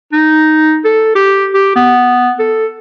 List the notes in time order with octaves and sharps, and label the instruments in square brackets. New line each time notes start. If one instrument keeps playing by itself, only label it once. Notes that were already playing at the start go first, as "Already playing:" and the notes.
[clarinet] D#4
A4
G4
G4
B3
A4